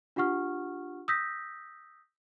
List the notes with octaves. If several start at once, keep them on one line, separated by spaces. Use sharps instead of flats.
D4 F4 G4 F#5 C#6 F6
D#6 E6 G6 A#6 B6